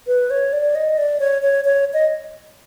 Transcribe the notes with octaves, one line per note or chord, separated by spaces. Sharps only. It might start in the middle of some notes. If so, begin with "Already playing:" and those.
B4
C#5
D5
D#5
D5
C#5
C#5
C#5
D#5